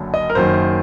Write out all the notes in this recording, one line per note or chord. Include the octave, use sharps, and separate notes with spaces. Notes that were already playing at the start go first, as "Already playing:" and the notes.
Already playing: F#1 F#2 D3
D#5
A#4
F#1 F#2 D#3 C5